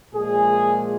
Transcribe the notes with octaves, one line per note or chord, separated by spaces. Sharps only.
A#2 F3 G#3 G#4